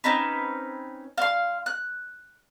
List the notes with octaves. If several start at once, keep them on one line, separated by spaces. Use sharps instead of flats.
C4 C#4 D#4 B4
F5 C6
F#6